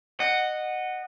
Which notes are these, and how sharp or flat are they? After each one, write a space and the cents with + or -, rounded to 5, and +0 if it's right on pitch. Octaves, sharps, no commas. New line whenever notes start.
D#5 -20 F#5 +0